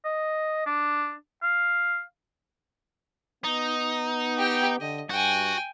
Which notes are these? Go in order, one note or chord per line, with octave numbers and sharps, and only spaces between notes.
D#5
D4
F5
B3 D#4
G4 G5
D3 D#5
G2 F#4 G5 G#5